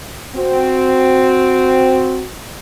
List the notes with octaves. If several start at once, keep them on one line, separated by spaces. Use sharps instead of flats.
C4 F#4